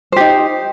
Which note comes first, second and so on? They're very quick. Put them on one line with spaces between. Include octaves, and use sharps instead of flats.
C5 G4 D#4